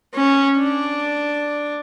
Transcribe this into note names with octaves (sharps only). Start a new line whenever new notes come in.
C#4
D4